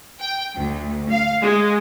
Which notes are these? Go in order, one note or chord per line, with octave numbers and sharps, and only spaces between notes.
G5
D2
F5
G#3